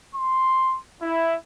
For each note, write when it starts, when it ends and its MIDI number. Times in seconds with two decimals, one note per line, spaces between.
0.14 0.78 84
1.02 1.36 64